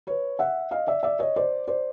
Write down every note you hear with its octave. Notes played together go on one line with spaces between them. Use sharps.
B4 C#5
E5 F#5
D#5 F5
D5 E5
D5 E5
C#5 D#5
C5 D5
C5 D5